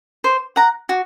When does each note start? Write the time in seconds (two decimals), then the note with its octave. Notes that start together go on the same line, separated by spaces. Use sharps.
0.24 C5
0.56 F#5 A#5
0.89 F#4